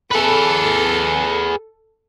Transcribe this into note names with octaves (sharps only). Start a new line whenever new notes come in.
G#4 A4 B4